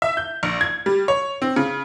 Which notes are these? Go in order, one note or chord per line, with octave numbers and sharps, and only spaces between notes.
E5
G6
A#1
G#6
G3
C#5
C4
C#3